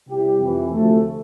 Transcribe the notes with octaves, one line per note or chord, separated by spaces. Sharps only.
C3 G3 C4 E4 G4
F2 C3 E3
D2 C3 F3 A3